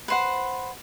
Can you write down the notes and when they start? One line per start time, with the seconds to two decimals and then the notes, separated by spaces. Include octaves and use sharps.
0.08 B4 C5 F#5